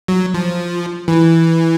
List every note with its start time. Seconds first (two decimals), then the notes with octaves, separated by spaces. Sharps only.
0.08 F#3
0.34 F3
1.08 E3